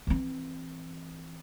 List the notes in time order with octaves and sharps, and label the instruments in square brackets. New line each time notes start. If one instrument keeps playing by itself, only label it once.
[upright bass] E3 C4